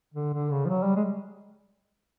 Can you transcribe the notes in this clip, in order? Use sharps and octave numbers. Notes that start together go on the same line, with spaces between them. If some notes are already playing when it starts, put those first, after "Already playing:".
D3
D3
C#3
F3
F#3
G3
G#3